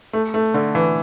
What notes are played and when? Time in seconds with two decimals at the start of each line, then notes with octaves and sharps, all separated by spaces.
0.13 A3
0.34 A3
0.54 D3
0.75 E3